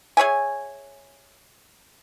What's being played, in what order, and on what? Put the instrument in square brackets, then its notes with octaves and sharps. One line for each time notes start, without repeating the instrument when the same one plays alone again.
[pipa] G#4 C#5 E5 G#5